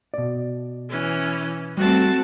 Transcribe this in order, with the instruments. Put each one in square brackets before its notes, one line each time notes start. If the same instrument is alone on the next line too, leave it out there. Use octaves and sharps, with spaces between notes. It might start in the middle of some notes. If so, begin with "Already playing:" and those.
[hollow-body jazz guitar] B2 D5
[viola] E3 C#4
[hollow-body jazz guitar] G3 [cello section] A3 C4 [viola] F#4 A5